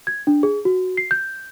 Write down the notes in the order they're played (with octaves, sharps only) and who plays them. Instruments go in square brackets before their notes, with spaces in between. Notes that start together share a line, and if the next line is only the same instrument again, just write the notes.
[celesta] G#6
D4
G#4
F#4
C7
G6